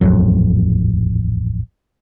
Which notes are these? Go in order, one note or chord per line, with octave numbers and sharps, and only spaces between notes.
D#1 A1 F2 F#3